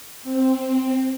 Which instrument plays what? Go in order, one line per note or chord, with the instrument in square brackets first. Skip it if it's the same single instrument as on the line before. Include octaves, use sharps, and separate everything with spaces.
[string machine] C4